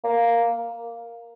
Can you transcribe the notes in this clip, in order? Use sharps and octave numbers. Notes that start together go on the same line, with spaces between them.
A#3